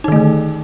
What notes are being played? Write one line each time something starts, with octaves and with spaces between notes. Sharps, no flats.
D3 D#3 A3 D#4